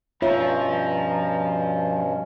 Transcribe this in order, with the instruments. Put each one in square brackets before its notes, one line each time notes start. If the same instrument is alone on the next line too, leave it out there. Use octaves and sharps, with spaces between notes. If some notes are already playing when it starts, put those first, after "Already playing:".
[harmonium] G2 B2 C#4 [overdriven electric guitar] F3 [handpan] F4 C#5 E5 [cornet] A#5